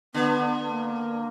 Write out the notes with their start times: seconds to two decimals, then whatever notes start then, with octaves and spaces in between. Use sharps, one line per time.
0.14 D3 B3
0.69 A#3